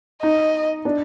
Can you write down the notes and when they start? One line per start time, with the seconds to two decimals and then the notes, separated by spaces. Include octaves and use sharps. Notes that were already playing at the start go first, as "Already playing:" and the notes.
0.23 D#4 D#5
0.85 D4